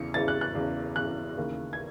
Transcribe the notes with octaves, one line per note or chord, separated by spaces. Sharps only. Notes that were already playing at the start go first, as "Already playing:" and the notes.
Already playing: E2 C#3 E3 C#7
E2 C#3 E3 A6
F#6
F#6
E2 C#3 E3
E2 C#3 E3 F#6
D#2 C#3 E3
G#6